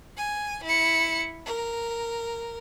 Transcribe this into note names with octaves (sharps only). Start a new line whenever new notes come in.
G#5
E4 C#7
A#4